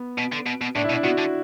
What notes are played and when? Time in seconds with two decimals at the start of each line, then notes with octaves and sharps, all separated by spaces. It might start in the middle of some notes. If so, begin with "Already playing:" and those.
Already playing: B3
0.18 B2
0.32 D3
0.46 B2
0.61 B2
0.75 A2 D4
0.84 E4
0.90 B2
0.93 D4
1.03 B2 F#4
1.18 D3